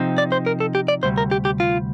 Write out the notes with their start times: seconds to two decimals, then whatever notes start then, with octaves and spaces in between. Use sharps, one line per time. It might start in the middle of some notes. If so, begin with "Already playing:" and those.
Already playing: C3 F3 C4 D#4
0.18 D5
0.32 C5
0.46 A#4
0.60 A4
0.75 G4
0.88 D5
1.03 D2 C3 G3 C5
1.18 A#4
1.31 G4
1.45 G4
1.60 F4